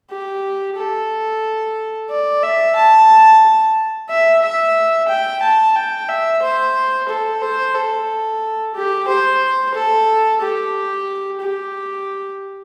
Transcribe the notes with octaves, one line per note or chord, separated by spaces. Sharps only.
G4
A4
D5
E5
A5
E5
E5
G5
A5
G5
E5
C5
A4
C5
A4
G4
C5
A4
G4
G4